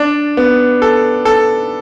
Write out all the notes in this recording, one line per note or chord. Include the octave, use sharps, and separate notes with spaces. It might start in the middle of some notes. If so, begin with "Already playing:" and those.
Already playing: D4
B3
A4
A4